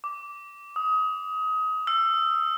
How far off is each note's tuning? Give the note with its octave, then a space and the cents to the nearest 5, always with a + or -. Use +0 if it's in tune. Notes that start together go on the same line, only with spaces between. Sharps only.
D6 -10
D#6 +25
E6 +25